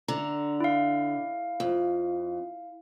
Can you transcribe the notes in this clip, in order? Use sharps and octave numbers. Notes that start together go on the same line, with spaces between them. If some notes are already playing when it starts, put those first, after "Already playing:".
D3 A#5
E4 F5
F2